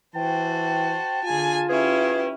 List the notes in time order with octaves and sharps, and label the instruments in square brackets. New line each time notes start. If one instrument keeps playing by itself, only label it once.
[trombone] E3 [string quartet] F#4 C5 [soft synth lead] G5 [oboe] A5
[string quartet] D3 G#4 G#5 [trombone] F4
[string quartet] C#4 E4 G4 [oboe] G#4 [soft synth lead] B4